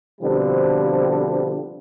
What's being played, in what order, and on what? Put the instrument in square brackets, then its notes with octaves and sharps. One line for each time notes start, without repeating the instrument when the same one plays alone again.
[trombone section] B2 D3 F3 G3 C4